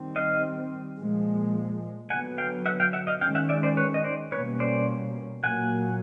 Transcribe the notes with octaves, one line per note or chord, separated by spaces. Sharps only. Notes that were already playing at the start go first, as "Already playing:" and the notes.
Already playing: D#3 G3 C4
D#5 F5
A#2 F3 G#3
D3 F#3 B3 F#5 G#5
F5 G5
E5 F#5
F5 G5
E5 F#5
D#5 F5
D#3 G#3 C#4 F5 G5
E5 F#5
D5 E5
C5 D5
B4 C#5
D#5
C5 D5
B2 G3 A#3 C#4 B4 C#5
C5 D5
A#2 F#3 A#3 F#5 G#5